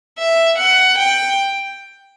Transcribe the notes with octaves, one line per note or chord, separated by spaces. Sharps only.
E5
F#5
G5